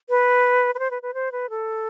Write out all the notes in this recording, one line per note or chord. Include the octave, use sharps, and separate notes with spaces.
B4
B4
C5
B4
B4
C5
B4
A4